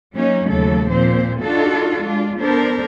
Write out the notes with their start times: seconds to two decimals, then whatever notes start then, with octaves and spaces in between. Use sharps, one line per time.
0.15 F#3 A#3 C#4 D#4
0.48 D#2 C#3 F#3 A3 A4
0.90 A#2 F3 C4 C5
1.40 D4 D#4 F4 F#4 A4
2.03 G#3 D4 F4
2.39 B3 D4 A4 A#4 C5